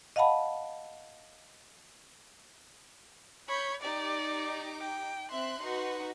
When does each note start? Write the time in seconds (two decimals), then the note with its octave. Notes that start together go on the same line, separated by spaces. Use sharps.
0.16 D#5 F5 F#5 A5 B5
3.48 C#5 B5 G6
3.82 D#4 G4 D5 D6
4.81 G5
5.31 C4 E5 C6 F#6
5.62 D#4 F#4 B4